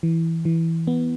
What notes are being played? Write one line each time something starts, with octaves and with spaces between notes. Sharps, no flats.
E3
E3
B3